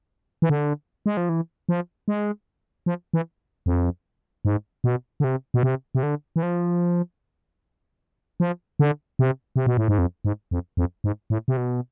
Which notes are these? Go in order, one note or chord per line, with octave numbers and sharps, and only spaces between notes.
E3
D3
G#3
F3
E3
F3
G#3
F3
E3
F2
G#2
B2
D3
C3
B2
C3
C3
D3
E3
F3
F3
D3
C3
C3
B2
A2
G#2
F2
G#2
F2
F2
G#2
A2
C3
B2